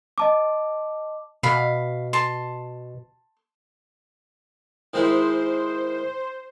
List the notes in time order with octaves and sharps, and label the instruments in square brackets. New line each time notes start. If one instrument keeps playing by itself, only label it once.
[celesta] D#5 A5 D6
[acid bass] B2 [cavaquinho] F5 B5
[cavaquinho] A5 C6
[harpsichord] D#3 G#3 E4 [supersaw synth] C5